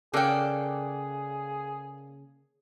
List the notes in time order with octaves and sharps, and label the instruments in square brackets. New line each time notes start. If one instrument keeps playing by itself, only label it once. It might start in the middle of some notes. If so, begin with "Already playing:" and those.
[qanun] C#3 [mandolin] A#3 D5 F#5 [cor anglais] G#4 [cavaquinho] A4 G5